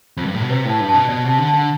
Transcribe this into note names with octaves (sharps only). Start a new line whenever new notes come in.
F2
G2
A2
B2
C3 B4
A2 A5
G2
B2 A5
B2 D5
C3
A5
D3
A5
D3